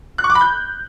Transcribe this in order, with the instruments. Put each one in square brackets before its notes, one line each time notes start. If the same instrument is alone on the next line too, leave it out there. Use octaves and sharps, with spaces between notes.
[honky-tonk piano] F#6
C#6
D6
B5
G6